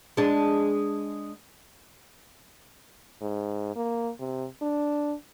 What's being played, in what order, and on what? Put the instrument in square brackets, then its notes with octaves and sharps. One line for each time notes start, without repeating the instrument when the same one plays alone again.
[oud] G#3 D4
[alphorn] G#2
A#3
C3
D4